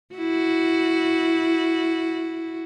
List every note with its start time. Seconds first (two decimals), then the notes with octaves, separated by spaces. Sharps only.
0.15 E4 F#4